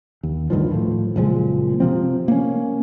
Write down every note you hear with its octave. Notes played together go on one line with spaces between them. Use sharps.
D#2
D2 G2 D#3 F3
A2 F3
F#1 A#2 F3 G#3
C3 F3 C4
A#3 B3 C#4